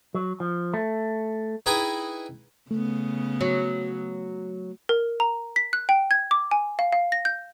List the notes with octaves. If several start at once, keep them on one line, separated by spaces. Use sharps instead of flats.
F#3
F3
A3
D#4 E4 G#4 B4 G5 G#5
C#3 A3 B3
F#3
A#4
A#5
B6
F#6
G5
G#6
D6
G#5
F5
F5
A#6
G6